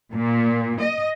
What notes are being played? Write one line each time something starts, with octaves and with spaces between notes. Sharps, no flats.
A#2
D#5